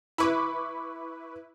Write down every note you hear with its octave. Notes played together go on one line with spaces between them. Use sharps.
E4 B4 B5 C#6 D6